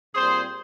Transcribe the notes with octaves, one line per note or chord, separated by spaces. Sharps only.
A#2 G3 C4 G#4 C5